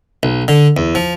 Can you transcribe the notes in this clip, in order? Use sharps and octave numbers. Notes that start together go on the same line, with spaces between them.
B1
D3
E2
F3